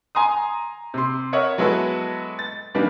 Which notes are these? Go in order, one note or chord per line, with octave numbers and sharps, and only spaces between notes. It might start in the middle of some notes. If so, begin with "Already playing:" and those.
G#5 A#5 C6 D#6
C3 C6
A#4 C#5 D#5 E5 F#5
F#3 G#3 B3 E4 A4 B4
A6
D#3 E3 G3 A#3 B3 D4